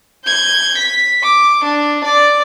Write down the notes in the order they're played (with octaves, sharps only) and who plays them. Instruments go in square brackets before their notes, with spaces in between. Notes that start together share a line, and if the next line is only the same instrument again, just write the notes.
[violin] G6 G#6
B6
D6
D4
D5